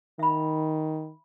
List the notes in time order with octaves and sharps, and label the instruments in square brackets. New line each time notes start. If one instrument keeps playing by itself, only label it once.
[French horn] D#3 [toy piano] E5 B5